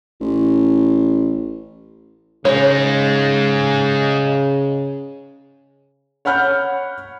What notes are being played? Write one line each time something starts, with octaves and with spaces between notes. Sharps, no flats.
A1
C#3 G#3 D#4 C#5
C#5 F#5 B5 F6 G6